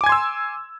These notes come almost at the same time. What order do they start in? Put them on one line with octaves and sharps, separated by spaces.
D6 G#5 G#6 C6 E6